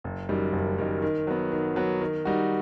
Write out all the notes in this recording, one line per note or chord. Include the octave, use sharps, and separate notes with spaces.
F#1
F#2 D#3 G3
F#1
F#2 D#3 G3
D#3
F#3 B3
D#3
F#3 B3
D#3
G3 D#4 F#4